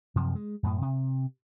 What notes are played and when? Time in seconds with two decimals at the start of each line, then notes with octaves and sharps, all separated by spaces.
0.15 F#2 C3 F3
0.35 G#3
0.63 F#2 A2
0.81 C3